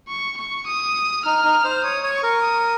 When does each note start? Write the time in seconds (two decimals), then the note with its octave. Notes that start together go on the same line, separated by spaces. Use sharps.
0.08 C#6
0.38 C#6
0.67 D#6
1.25 D#4 F6
1.45 D#4
1.64 C5
1.84 C#5 D#6
2.04 C#5
2.13 C#6
2.23 A#4
2.42 D#6